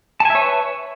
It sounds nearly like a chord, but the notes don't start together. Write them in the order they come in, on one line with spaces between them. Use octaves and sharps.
A5 G#5 E5 C#5 B4